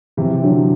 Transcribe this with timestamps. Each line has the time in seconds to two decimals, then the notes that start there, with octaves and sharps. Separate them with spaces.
0.17 C3 E3
0.43 D3 F#3